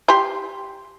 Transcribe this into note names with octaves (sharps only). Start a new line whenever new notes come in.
G4 C6